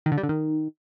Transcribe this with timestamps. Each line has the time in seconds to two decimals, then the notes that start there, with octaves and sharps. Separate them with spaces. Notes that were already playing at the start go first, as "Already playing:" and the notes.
0.06 D#3
0.12 D3
0.18 G3
0.23 D3
0.29 D#3